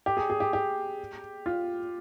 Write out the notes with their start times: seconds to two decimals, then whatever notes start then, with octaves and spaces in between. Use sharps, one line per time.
0.06 G4
0.17 G#4
0.30 G#4
0.40 G4
0.53 G4
1.46 F4